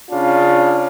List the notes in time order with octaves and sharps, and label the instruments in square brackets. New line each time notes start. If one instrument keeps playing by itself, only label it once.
[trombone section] C#3 D4 F4